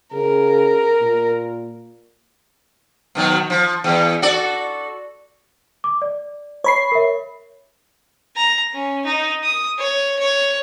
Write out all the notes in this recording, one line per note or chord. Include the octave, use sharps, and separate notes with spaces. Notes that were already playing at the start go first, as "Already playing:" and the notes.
C#3 A#4
A#2
B2 D#3 F#3
F3
E2
F#4 A4 D5
D6
D5
C#5 B5 C7
A#4 E5
A#5
C#4
D#4
D#6
C#5
C#5